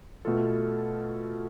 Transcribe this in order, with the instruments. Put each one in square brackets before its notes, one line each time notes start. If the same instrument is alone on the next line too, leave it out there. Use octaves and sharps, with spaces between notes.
[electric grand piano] B2 A3 F4 A4